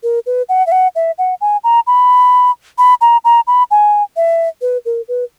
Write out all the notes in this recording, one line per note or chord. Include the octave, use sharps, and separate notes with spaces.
A#4
B4
F#5
E5
F#5
E5
F#5
G#5
A#5
B5
B5
A#5
A#5
B5
G#5
E5
B4
A#4
B4